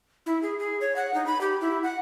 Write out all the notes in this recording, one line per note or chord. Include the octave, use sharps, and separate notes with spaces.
E4
G#4
G#4
C#5
F#5
D#4
B5
G4
E4
F#5